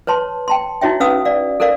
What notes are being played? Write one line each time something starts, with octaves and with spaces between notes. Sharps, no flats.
B4 C#5 A5 C6
G5 A5 C6
D#4 E4 F#4 C#5 E5 G5
C#4 B4 F5 D#6 E6
D5 F5
A4 A#4 C5 D5 F5